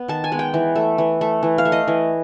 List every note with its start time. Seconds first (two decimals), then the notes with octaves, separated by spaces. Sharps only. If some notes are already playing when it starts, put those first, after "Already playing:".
Already playing: B3
0.08 D#3 A5
0.24 G#5
0.32 G#3 B3
0.39 G5
0.54 E3
0.75 A3
0.98 E3
1.21 A3
1.43 E3
1.58 F5
1.65 A3
1.72 D#5
1.87 E3